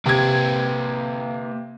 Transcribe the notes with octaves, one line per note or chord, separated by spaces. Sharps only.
C3 A#3 B4 G5 G#6